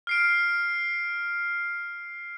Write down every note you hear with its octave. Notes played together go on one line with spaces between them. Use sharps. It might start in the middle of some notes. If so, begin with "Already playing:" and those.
F6 C7 D7